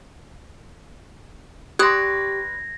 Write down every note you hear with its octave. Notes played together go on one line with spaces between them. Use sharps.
G4 B4 D5 C6 D#6 F#6 G#6 A#6